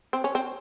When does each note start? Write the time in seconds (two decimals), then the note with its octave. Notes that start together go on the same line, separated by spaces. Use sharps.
0.13 C4
0.24 C#4
0.35 C4